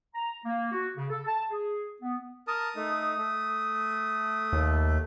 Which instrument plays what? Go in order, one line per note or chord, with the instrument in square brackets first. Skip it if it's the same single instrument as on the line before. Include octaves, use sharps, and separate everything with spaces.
[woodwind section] A#5
A#3
F#4
C#3
A4
A5
G#4
B3
[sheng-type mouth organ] A#4 A5 [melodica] D#6
[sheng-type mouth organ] A3 D#4
A3
[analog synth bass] D#2